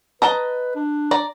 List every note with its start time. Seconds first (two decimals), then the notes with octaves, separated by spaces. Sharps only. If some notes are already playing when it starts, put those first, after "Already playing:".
0.22 B4 D#5 A5 A#5
0.75 D4
1.11 D5 A#5